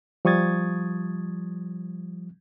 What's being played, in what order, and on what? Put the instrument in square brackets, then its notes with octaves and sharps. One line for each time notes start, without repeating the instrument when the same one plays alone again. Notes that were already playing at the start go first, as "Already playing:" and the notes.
[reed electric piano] F3 G3 C#6 D#6 G#6 A6